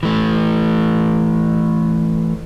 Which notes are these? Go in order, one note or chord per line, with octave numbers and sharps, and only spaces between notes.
E3 A3